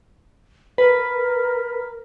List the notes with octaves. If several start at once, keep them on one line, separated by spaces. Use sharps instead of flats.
A#4 B4